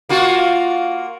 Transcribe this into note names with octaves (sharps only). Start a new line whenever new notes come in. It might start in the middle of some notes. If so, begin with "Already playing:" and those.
A#3 F4 F#4